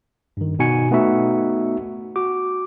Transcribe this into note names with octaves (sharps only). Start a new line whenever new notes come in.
G2 D#3
B2 D#4 F#4 G#5 C#7
A3 B3 D#4 F#4 E5
F#4 D6